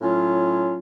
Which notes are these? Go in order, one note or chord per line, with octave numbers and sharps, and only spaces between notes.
A2 F#3 C#4 F4